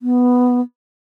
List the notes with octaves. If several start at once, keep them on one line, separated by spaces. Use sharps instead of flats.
B3